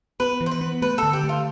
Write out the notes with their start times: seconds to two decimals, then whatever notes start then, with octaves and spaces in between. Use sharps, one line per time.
0.20 B3 B4
0.41 E3
0.46 C5
0.51 B4
0.61 B3
0.82 A3 B4
0.98 D3 A4
1.13 G4
1.24 A3
1.29 F4